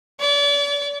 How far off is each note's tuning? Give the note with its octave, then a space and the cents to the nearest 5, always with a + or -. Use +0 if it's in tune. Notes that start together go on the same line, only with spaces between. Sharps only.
D5 -40